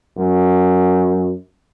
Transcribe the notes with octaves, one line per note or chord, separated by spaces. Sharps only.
F#2